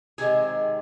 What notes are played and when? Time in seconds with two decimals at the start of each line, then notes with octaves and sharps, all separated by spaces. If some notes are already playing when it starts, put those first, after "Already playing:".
0.18 C3 D#3 G#3 G#4